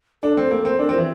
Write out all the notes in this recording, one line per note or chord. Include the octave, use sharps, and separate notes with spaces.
D4 A4
C4
A#3
C4
D4 A#4
C4
E3 E4